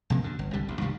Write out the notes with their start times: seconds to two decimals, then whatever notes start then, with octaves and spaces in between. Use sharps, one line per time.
0.10 A#1 C3 A#3
0.23 F#2 D3
0.39 G1
0.53 C2 D3 G3
0.68 A1 D2
0.81 C2 G2 D#3 G3